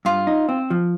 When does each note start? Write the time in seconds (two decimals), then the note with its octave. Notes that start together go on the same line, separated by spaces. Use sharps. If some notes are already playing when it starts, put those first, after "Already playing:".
0.05 G2 F4
0.27 D#4
0.49 C4
0.70 F3